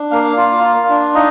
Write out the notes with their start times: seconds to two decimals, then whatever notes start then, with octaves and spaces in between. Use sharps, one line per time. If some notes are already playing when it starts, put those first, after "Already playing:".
Already playing: D4
0.11 A#3 F5
0.37 F4
0.63 F4
0.89 D4
1.14 D#4 D#5